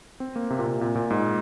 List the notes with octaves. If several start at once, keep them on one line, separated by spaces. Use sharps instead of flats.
C4
A#3
C3
A#2
C3
A#2
A#2
G#2